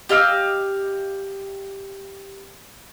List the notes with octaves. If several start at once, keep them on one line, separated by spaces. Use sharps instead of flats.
G4 D#5 F5 E6